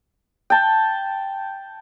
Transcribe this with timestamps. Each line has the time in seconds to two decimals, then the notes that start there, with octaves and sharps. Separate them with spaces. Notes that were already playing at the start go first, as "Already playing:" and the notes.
0.50 G5 A5